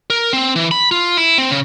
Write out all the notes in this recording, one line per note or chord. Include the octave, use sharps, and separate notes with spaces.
A#4
C4
E3
B5
F4
E4
C4
C#3